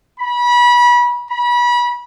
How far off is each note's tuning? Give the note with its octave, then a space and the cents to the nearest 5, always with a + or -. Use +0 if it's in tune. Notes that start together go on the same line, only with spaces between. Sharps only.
B5 -30
B5 -30